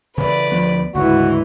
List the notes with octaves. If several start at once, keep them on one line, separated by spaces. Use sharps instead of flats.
C#3 E3 B4 D5
D2 F3 B3
D2 G#2 C#3 E3 F#4